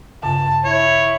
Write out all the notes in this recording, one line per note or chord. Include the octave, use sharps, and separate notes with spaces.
G2 C#3 A5
E4 C#5